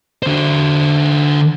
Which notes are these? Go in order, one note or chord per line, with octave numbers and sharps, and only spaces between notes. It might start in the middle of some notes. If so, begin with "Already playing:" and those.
D3 C5